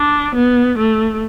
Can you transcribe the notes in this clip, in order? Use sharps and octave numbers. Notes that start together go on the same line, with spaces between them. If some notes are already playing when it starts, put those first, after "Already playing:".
Already playing: D4
B3
A3